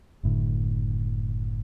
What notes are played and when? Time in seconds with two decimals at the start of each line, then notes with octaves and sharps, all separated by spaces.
0.23 F#1 A2 D3